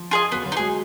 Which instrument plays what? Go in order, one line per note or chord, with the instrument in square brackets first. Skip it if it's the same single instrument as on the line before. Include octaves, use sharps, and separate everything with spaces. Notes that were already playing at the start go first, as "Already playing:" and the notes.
Already playing: [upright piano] F3
[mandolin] F4 G#4 D#5
[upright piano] F#3 [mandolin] B3
[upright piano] F#3
[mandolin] D#4
[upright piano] G#3 [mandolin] G#4